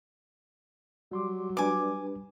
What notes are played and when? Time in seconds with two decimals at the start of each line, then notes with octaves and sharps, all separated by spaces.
1.11 F#3 G3 C6 D6
1.57 G3 D4 B4 G#5 D6